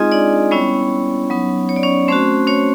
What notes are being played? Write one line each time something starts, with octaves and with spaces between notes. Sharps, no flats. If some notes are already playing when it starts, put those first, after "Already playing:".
Already playing: G#3 C4 D#4 F4 G#4 D#5 G#5
D4 D5
G3 B3 C#4 E4 C#5
F#3 B3 D#4
C#5
D5
C#4 C#5
A3 C4 C#4 F#4 C5
C#4 C#5